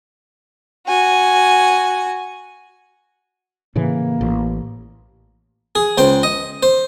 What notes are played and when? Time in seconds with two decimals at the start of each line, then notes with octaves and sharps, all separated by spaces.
0.87 F#4 G#5
3.76 A2 C#3 E3 A#3
4.21 A1
5.75 G#4
5.98 C#2 C5 G5
6.23 D#5
6.63 C5